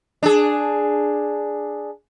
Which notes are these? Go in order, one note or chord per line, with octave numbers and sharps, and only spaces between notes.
D4 G#4